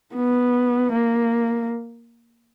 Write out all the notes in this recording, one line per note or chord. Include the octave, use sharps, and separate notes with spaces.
B3
A#3